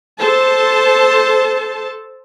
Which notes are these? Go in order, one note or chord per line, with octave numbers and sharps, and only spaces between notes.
A4 C5 A5